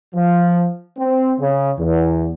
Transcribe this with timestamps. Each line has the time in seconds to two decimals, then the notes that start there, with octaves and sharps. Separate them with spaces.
0.15 F3
0.98 C4
1.40 C#3
1.79 E2